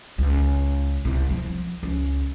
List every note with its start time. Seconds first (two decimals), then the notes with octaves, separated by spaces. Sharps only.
0.18 C#2
1.05 C2 C3
1.30 F3
1.83 C#2